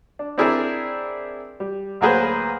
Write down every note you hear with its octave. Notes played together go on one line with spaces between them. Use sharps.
D4
C4 D4 E4 G#4 A#4 D5
G3
D2 F#3 A#3 G#4 B4 C5